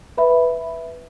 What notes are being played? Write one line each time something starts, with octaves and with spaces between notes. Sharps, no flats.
B4 E5 B5